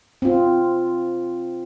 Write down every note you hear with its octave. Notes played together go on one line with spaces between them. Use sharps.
C4 F4